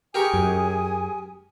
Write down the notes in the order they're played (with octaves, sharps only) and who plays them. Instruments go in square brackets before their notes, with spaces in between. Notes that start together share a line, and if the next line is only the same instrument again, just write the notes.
[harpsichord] G4 A#4 C#6 [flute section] G#4 G#5 D#6
[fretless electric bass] F#2